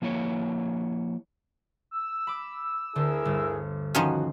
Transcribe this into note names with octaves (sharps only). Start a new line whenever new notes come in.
F3 A#3 E4 C#5
E6
B5 D6
D2 D3 E4 G#4 A#4
G1
D#3 F3 C#4 F#4 C6